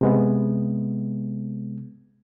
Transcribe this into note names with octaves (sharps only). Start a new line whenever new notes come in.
C3 G#3 B3